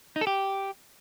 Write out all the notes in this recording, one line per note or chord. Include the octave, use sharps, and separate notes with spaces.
D#4
A4
G4